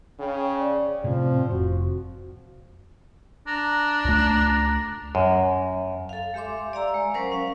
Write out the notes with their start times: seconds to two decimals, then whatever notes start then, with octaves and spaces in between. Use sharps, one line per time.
0.19 C#3 G5
0.59 D5
1.04 A2 C3 F3 C4
1.50 F1 F#4
3.47 D4 A#5
4.05 C#2 A3 A#5
5.15 F#2
6.09 A4 F5
6.34 G#3 G4 E5 C6 D6
6.73 D5 F5 A#5 E6
6.94 G#3
7.14 F#3 C#4 A#4 C5
7.32 C#4 F5